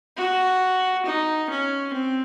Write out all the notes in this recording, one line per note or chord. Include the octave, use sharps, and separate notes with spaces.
F#4
D#4
C#4
C4